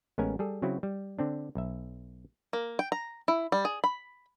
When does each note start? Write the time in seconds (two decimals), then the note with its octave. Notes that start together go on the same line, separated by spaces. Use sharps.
0.18 A1 G#3 B3 C#4 A#4 G#5
0.39 G3 G#4 A4
0.62 C#3 F#3 C4 E4 F#4
0.83 G3
1.19 D3 C4 D4
1.55 B1 E5
2.53 A#3
2.79 G5
2.92 A#5
3.28 E4
3.52 G3
3.65 G#4
3.84 B5